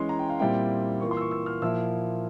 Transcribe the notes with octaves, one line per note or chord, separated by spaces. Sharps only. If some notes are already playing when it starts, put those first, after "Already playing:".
Already playing: E3 G#3 C#4 C6
A#5
G5
F5
A#2 G3 C4 E4 G5
E3 A#3 F4 C#6
C6
E6
C#6
E6
F6
A#2 F3 A#3 E4 E6